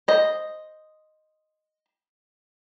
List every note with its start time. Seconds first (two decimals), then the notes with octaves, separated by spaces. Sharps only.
0.08 C5 D#5